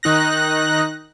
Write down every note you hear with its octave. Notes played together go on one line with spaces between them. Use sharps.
D#3 D#4 F#6 A#6